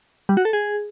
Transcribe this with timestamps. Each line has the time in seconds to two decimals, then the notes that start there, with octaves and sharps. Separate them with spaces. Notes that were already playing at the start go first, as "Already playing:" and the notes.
0.29 G3
0.37 F#4
0.45 A4
0.53 G#4